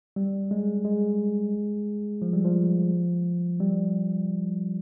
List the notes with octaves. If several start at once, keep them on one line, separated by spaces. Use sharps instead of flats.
G3
G#3
G#3
F3
G3
F3
G3